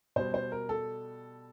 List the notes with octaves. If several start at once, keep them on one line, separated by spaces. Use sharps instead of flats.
B2 G3 C5
C5
A#4
A4